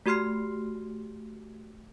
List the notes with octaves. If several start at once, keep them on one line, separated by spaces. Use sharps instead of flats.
A3 F#4 G4 C6 F6 C7